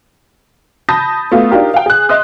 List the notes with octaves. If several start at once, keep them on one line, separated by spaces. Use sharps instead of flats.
A5 B5 D#6 G6 A#6
A3 B3 F4
D4 D#4 F4 G4 A#4
F5 G5
G#4 F#6
D#5 E5 C6 D#6 F#6